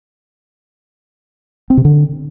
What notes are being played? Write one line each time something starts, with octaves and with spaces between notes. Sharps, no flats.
C4
C3
D3